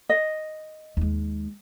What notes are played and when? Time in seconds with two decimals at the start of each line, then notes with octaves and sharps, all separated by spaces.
0.09 D#5
0.97 D#2 G#3